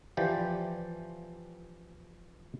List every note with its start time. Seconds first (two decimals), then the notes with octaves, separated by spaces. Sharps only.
0.17 E3 F3 G4 D5